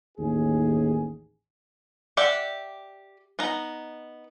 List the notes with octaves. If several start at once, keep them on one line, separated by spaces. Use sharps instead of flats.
A1 D#2 G#4
G4 D5 E5 F#5
B3 D#4 A#5